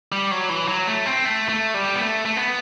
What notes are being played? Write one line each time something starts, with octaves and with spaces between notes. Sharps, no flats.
G3
F#3
E3
F#3
A3
C4
A3
A3
G3
B3
A3
A3
B3